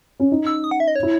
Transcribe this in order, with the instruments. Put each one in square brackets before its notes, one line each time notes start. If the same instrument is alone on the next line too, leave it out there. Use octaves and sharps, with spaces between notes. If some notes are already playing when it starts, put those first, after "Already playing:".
[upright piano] C#4
D#4
[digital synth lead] E6
D#6
F#5
E5
D#5
C#5
[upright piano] E4